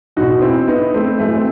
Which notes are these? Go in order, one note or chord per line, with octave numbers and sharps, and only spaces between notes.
E2 B2 D#4 F#4
C4 E4
B3 D#4
A3 C4
F#2 E3 A3
C4